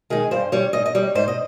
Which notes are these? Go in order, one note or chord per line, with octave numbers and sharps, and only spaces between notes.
D#3 G#3 G#4
G2 C5
G3 C#5
G#2 D#5
D#5
G3 C#5
G#2 C5
D#5